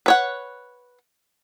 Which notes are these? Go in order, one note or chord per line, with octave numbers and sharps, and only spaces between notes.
B4 C#5 F#5